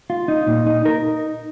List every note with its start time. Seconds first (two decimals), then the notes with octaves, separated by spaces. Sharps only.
0.10 F4
0.28 D#4
0.47 A#2
0.66 D#4
0.85 D#4 A#4